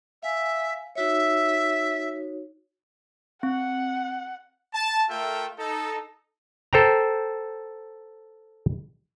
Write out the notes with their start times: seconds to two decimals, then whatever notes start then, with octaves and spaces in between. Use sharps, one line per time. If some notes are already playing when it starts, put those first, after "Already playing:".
0.23 E5 F5 G#5
0.96 D#4 F#4 C#5 E5
3.43 C4 F#5
4.73 A5
5.08 A3 F4 A4 A#4 E5 G5
5.58 D#4 A4
6.73 A4 C5 G5 A#5